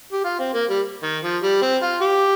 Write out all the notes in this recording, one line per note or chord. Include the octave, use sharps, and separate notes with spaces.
G4
F4
C4
A#3
G3
D#3
F3
G3
C4
F4
G4